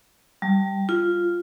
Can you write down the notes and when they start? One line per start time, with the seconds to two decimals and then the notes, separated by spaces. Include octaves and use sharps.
0.42 G3
0.89 F4